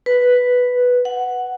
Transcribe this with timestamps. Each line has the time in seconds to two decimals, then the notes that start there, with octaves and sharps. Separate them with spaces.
0.06 B4
1.05 F#5